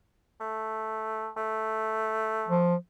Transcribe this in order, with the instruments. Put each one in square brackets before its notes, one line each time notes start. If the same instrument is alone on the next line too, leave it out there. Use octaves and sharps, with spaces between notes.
[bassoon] A3
A3
[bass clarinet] F3